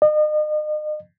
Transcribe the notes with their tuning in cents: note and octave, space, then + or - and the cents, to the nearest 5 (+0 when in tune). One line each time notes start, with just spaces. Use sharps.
D#5 -40